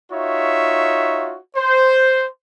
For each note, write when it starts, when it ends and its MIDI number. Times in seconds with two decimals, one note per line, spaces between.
0.12 1.36 63
0.12 1.36 65
0.12 1.36 66
0.12 1.36 73
0.12 1.36 76
1.56 2.25 72